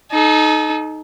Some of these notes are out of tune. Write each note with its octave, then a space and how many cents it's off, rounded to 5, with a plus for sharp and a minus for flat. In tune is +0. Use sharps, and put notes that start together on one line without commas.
D#4 +0 A4 -35